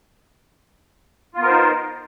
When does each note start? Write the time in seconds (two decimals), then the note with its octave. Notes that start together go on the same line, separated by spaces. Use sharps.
1.34 F4
1.38 B3
1.42 A#4
1.46 C5
1.50 D#4